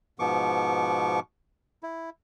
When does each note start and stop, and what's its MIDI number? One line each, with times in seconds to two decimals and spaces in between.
0.19 1.20 44
0.19 1.20 47
0.19 1.20 53
0.19 1.20 59
0.19 1.20 85
0.19 1.20 86
1.83 2.10 64